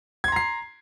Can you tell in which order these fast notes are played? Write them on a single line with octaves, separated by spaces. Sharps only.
G#6 C6 A#5 C7